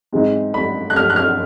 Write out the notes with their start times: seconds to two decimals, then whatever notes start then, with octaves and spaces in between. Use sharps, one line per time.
0.12 G#2 E3 G#3 C4 D#4
0.54 B5
0.90 F#6
0.96 F6
1.10 F#6
1.16 F6